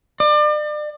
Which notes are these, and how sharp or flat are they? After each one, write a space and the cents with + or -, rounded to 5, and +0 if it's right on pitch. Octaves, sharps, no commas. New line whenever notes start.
D5 +35